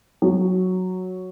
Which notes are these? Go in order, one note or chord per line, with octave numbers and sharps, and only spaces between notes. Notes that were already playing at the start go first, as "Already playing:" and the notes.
F#3